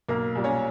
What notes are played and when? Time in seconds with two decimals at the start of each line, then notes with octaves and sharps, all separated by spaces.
0.09 B1 A#3 A#4
0.36 A#2 G3
0.44 C#4 C#5